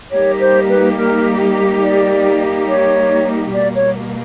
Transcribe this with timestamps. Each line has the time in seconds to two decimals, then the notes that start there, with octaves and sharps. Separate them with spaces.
0.12 G3 A#3 D#4 G4 C#5
0.40 C5
0.69 B4
0.97 A#4
1.83 D5
2.68 C#5
3.53 B2 G3 A#3 D5
3.75 C#5